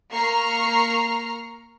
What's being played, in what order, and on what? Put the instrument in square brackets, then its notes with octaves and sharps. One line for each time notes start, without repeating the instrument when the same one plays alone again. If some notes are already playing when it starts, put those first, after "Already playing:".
[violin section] A#3 A#5 C#6 F6 C7